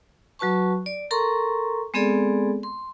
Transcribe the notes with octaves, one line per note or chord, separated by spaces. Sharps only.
F#3 F#4 B4 A5 C#6
D5
A4 A#4 A#5 C6 C#6
G#3 B3 C4 G#4 A4 D5
C6